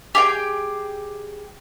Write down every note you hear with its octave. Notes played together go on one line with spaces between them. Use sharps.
G4 G#4 G5